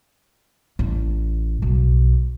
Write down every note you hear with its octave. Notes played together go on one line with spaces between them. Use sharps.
A1
B1